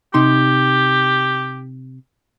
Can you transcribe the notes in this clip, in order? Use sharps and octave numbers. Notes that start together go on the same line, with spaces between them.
C3 D#4 G4 C6